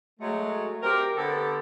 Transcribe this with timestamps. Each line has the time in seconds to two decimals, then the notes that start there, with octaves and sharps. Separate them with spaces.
0.20 F#3 G#3 A3
0.82 C4 G4 A#4
1.17 D3 B3 G4 A4